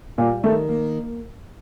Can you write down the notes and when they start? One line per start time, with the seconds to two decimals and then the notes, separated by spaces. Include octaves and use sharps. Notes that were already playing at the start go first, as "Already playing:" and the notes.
0.18 A#2 G3
0.43 D#3 A3
0.69 A#3